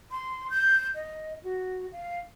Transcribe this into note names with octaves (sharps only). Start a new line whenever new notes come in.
C6
G6
D#5
F#4
F5